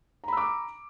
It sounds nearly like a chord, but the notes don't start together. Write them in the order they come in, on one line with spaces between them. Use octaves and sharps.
A#5 B5 E6 D6